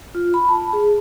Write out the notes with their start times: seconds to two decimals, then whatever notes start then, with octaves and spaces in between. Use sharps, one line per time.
0.15 F4
0.34 B5
0.49 A5
0.73 G#4